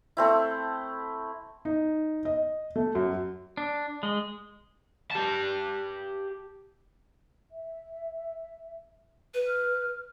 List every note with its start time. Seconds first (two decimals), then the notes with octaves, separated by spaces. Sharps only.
0.17 A3 C4 E4
1.65 D#4
2.25 D#5
2.76 A3
2.95 F#2
3.57 D4
4.03 G#3
5.11 G4 A5
7.50 E5
9.34 B4
9.47 F6